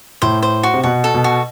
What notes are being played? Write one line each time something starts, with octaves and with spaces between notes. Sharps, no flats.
A2 C5
C5
F#4
C3
B2 F#4
A4
B2
F#4